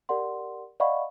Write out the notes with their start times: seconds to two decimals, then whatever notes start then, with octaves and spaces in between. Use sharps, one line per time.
0.09 G4 A#4 D5 F#5 C6
0.80 D5 D#5 F5 F#5 B5 C#6